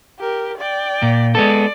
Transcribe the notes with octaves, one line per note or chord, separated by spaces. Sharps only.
G4 A#4
D5 G5
A#2
G#3 B3 A4 D5